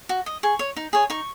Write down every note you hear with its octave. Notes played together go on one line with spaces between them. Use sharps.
F#4
D#5
G#4 C#6
C#5
D#4
G#4 C#5
D#4 C#6